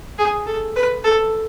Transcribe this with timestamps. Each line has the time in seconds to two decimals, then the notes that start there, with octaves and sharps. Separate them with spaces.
0.18 G#4
0.46 A4
0.76 B4
1.04 A4